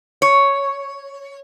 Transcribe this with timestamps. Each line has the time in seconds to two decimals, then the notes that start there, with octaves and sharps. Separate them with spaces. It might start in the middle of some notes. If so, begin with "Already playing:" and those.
0.22 C#5